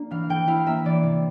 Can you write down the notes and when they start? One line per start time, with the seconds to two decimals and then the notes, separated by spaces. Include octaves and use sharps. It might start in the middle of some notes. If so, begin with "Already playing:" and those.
Already playing: A#3 D4
0.11 E3 F5
0.29 E3 G5
0.47 E4 F5
0.66 A#3 E5
0.85 E3 D5
1.03 C3